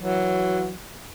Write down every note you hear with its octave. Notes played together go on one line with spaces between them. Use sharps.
E3 F#3